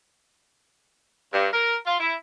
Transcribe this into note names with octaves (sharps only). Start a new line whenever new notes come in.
G2
A#4
F4
E4